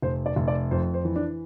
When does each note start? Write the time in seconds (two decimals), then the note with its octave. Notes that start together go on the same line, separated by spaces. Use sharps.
0.02 F1 C5
0.26 D5
0.36 F1
0.48 D5
0.71 F2 C5
0.94 C5
1.05 E3
1.16 D4